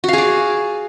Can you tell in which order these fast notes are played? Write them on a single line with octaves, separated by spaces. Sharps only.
F#4 F5 G#4 D5